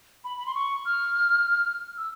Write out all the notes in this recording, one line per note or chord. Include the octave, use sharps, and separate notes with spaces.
B5
B5
C6
C#6
F6
E6